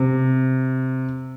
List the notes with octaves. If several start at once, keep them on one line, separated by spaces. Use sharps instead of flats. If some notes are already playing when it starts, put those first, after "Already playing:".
Already playing: C3